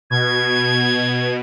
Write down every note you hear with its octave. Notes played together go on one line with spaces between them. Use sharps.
B2 G#6